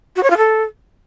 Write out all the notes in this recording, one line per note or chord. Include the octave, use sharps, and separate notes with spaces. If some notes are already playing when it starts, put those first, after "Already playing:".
F#4
C#5
F4
A4